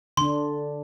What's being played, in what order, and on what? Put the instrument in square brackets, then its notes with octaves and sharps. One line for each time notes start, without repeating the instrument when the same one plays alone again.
[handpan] D3 D4 [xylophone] C6